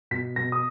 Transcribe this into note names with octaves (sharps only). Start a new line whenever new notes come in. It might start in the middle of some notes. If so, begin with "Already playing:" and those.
B2 B6
B2 A#6
D#6